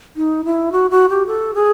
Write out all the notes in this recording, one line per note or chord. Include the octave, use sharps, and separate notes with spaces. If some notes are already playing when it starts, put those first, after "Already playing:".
D#4
E4
F#4
F#4
G4
A4
G#4